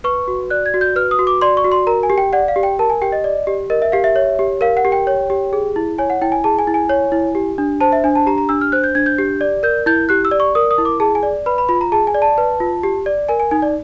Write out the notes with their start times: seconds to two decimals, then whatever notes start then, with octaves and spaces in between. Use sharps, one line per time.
0.04 B4 C#6
0.28 F#4
0.50 D5 F#6
0.66 G#6
0.74 F#4
0.81 G6
0.96 B4 F6
1.11 D#6
1.19 F#4
1.27 D6
1.42 D5 C6
1.57 C#6
1.65 F#4
1.72 C6
1.87 A#4 A#5
2.03 G#5
2.10 G4
2.18 G5
2.33 D5 F#5
2.48 F5
2.56 G4
2.63 G5
2.79 A#4 A5
2.90 G#5
3.02 G4 G5
3.12 D#5
3.24 D5
3.47 G4
3.70 A#4 D#5
3.82 E5
3.92 G4 F5
4.04 E5
4.16 C#5
4.39 G4
4.61 A#4 F5
4.77 F#5
4.85 G4
4.92 G5
5.07 C#5
5.30 G4
5.53 G#4
5.76 E4
5.98 C#5 G#5
6.10 F#5
6.21 E4 G5
6.32 G#5
6.44 G#4 A5
6.59 G#5
6.67 E4
6.74 G#5
6.90 C#5
7.12 E4
7.35 G4
7.58 D4
7.81 C5 A5
7.92 E5
8.04 D4 G#5
8.15 A5
8.27 G4 A#5
8.38 A#5
8.49 D4 E6
8.61 F6
8.72 C5 F#6
8.84 G6
8.95 D4 G#6
9.06 G6
9.18 G4
9.41 D5
9.63 A#4 G6
9.86 E4 G6
10.09 G4 F#6
10.25 E6
10.31 D5
10.40 C#6
10.55 A#4 D#6
10.71 D#6
10.78 E4
10.85 D6
11.00 G#4 A5
11.15 G#5
11.23 D5
11.46 B4 B5
11.58 B5
11.69 F4 B5
11.81 A#5
11.92 G#4 A5
12.07 G#5
12.14 D5
12.22 A5
12.38 B4
12.60 F4
12.83 G4
13.06 D5
13.29 A#4 G#5
13.40 G#5
13.51 D#4 G#5
13.62 D5